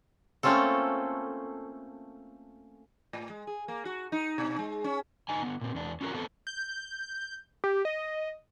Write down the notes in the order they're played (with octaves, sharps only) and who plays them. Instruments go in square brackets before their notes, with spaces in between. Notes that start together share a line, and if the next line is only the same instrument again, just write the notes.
[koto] A3 A#3 C4 C#4 F4 A4
[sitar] A2
G#3
G#4
A#3
F#4
D#4
B2
G#3
C#4
[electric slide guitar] D3 D4 D#4 G#5
D3 B3
A#2 C4
E2 D4
C#4 F4 F#4 A#4
B3 C4 A4
[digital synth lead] G6
G4
D#5